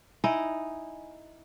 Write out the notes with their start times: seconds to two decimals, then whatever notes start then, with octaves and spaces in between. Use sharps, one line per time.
0.24 D#4 E4 D#5 G#5